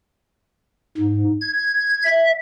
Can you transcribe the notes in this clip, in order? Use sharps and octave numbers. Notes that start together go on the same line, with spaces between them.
G#2
G#6
E5